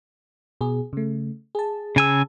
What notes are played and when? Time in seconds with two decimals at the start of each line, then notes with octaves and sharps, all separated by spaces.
0.61 B2 G#4
0.93 C#3 A3
1.55 G#4 A5
1.96 C#3 G#5 E6